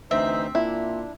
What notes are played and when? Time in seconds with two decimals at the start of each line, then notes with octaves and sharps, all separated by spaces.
0.11 D2 E3 C4 D#4 C5 E5
0.55 A#2 D4 E4